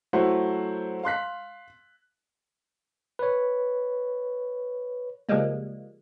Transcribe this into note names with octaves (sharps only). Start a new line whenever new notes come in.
F#3 A3 E4 C5 F#5
F5 C6 F#6 B6
B4 C#5
C#2 F3 G3 G#3 A#3